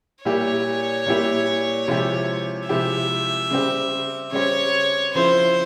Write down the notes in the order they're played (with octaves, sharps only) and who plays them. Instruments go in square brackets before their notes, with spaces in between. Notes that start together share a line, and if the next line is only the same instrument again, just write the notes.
[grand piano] A#2 G3 A#3 E4 G4 [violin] C#5
[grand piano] A#2 G3 A#3 E4 G4
C3 F3 G#3 E4 G4
[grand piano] C3 F3 G#3 E4 G4 [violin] E5
[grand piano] C#3 G3 C4 G4
[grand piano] C#3 G3 C4 G4 [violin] C#5
[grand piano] C#3 F3 C4 E4 [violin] C5